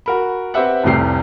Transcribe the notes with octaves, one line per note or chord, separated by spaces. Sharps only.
F#4 A#4 B5
C4 G4 B4 E5 F#5
F1 C2 A2 C3 G4 C7